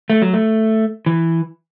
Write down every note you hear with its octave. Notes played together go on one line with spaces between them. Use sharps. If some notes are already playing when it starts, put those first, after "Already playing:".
A3
F#3
A3
E3